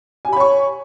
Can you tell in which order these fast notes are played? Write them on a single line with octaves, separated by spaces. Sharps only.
G#5 G4 B5 C#5 C#6